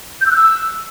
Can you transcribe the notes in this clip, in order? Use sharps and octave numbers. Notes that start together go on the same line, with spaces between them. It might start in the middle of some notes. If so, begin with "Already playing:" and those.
G6
E6
F#6
E6